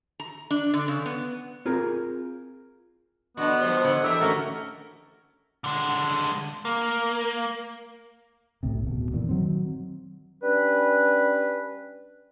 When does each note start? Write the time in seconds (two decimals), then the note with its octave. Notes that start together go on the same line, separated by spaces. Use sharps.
0.20 A#5
0.51 D4
0.74 D3
0.88 C#3
1.06 B3
1.65 C4 F4 G#4 A#4
3.37 D3 B3 D4 F#4 D#5
3.61 F3 G3 C5
3.84 D3 C#5
4.03 E2 E3 G4 A#4 E5
4.21 D#3 A3 C#4 F#4 A#4
5.64 D3 G#3
6.65 A#3
8.63 B1 A2 C3
8.84 D1 B2
9.13 F#2 A#2 D#3 E3
9.29 D#3 F#3 C4
10.42 G3 C#4 D4 B4